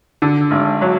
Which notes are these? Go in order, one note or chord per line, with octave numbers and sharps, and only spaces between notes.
D3
G#1
F#3